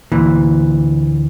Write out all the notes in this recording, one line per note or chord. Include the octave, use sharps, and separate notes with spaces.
D2 A#2 E3